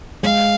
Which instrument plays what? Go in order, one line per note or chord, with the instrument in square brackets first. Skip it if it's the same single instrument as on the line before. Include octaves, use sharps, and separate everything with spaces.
[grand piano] G#3 [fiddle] F5